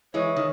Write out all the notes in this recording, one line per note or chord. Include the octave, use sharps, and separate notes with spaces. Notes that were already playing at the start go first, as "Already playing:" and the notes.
E3 G#3 C#5
D#3